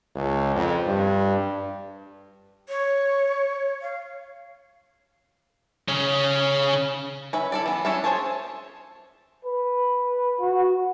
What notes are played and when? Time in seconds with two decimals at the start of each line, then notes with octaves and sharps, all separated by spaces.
0.16 C#2
0.55 F2
0.87 G2
2.69 C#5
3.82 F5
5.88 C#3 C#4
7.33 C#4 B4 E5
7.52 E4 A4 D5
7.66 E3 B3
7.85 C#4 D4 A4 C#5 E5
8.04 G#4 C5 C#5 A5
9.45 B4
10.41 F#4